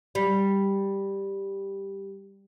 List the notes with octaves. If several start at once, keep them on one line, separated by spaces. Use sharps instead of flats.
G3